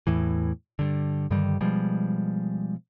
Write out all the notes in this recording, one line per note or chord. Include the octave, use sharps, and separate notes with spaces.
E2 A2 E3
G2 D3
G2 D3 D#3 G3
B2 F3 G3 G#3